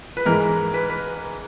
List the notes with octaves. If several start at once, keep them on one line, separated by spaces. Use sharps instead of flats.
B4
G#2 E3 G#3 A#4
B4
B4